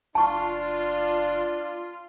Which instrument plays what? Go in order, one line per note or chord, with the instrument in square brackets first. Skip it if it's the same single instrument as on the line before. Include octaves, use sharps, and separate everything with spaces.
[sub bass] F#1 [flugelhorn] D4 [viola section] F4 [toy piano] A5 C#6